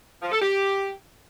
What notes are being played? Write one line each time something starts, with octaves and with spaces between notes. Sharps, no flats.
F3
A4
G4